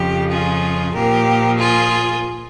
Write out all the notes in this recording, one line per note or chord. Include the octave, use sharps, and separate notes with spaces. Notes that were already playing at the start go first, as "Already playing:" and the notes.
Already playing: F2 C#3 F3 G4
F4 G#4
A#2 F3 A#3 G4 A#4
F4 G#4